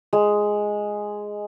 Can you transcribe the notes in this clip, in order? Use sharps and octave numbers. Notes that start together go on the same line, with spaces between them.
G#3